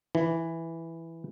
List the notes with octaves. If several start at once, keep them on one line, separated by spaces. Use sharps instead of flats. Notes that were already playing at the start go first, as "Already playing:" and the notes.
E3